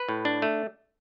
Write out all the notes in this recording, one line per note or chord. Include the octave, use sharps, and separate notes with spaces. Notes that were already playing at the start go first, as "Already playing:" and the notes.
Already playing: B4
A2
D4
A3